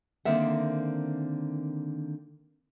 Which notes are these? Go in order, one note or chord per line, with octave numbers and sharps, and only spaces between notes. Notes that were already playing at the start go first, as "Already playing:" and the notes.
D3 D#3 A#3 C4 E5 F#5